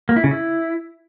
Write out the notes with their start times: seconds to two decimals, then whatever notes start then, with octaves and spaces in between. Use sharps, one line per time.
0.09 A#3
0.16 E4
0.24 C#3
0.31 E4